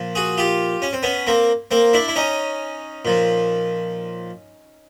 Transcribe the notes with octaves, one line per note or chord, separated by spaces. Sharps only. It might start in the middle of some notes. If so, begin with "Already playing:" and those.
Already playing: A#2 F3
F#4 G#4
F4 G4
C#4
C4
B3 C#4
A#3 C4
A#3 C4
D4 E4
E4
C#4 D#4
A#2 F3